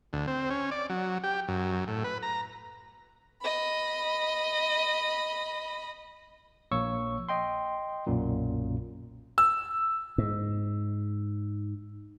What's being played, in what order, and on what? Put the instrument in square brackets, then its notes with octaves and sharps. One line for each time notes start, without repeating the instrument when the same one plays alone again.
[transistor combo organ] D2
C4
C#4
D5
F#3
G4
F#2
A2
B4
A#5
[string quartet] D#5 B5
[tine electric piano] A#1 A#3 C#5 C#6 E6
D#5 G5 C6
B1 F#2 A#2
[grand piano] E6
[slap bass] G#2